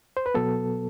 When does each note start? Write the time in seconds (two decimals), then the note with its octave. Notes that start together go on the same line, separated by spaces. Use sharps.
0.17 C5
0.26 B4
0.34 B2 F#3 B3 A4